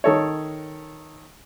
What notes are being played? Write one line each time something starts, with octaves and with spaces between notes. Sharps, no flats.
D#3 A4 C#5